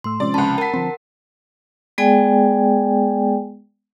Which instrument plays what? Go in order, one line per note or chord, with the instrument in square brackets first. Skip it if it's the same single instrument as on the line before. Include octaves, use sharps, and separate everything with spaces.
[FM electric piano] A2 A3 E6 [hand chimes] C6
[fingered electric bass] C3 F3 [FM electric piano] G#3 C#4 [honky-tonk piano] D5
[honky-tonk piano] C#2 C#3 [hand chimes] A5 B5
[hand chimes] A#4 F#5 [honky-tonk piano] A5 B6
[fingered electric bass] D3 F3 C4 [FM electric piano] C6
[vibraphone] G#3 B3 G#4 D5 G5 G#5